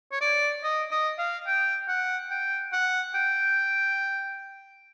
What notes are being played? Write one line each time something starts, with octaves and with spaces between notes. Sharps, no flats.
C#5
D5
D#5
D#5
F5
G5
F#5
G5
F#5
G5